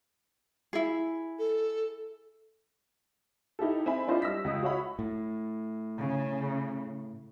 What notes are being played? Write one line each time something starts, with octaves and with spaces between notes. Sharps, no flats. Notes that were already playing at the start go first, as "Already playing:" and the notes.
E4 G#4
A4
D#4 E4 G4 A4
C4 E5 G#5 B5
D4 E4 F4 C5 D#5 E5
G3 E6 A#6 B6
C#2 D#5 D#6
F#4 C#5 E5 F#5 B5
A2
C#3